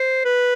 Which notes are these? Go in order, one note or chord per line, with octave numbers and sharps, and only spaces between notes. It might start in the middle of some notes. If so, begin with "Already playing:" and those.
Already playing: C5
B4